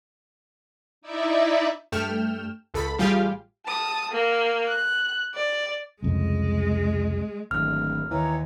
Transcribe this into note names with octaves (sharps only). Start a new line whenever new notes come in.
D#4 E4 D5 E5
G2 A3 G5 F6 E7
C#2 A4 B5
A1 G3 F4 G4 G#4 F5
A5 D#6
A#3
F#6
D5
C2 F2 C#3 G#3
D1 G#1 F6
D#2 E3 C#5 A#5